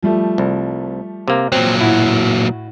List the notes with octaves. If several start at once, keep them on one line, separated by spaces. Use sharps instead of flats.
F3 G3 A3
C2
C3 A#3
A#2 F#3 C4
A2 E4 F#4